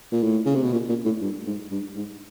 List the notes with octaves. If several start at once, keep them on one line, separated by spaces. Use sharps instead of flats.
A#2
A2
C#3
C3
B2
A#2
A#2
A2
G2
G#2
G2
G#2